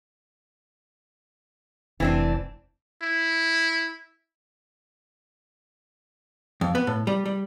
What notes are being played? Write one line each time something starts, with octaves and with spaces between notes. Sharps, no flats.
F1 E3 C4 D4
E4
F2
B3
A2
G3
G3